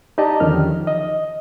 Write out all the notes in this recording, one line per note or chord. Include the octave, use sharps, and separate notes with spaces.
D#4 G4 D5 D#5 A5 A#5
E2 D3 D#3 F3 C#4 F6
D#5